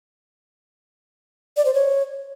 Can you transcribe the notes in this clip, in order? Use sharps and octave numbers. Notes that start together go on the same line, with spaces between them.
D5
C5
C#5